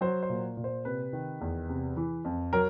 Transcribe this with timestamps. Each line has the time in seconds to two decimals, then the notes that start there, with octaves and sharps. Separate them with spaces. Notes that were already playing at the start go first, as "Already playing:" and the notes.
0.01 F#3 C5
0.23 C5
0.29 A#2
0.57 A#2
0.64 C5
0.85 C3 B4
1.13 D#3
1.41 E2
1.69 C3
1.97 E3
2.25 F2
2.53 F#3 A#4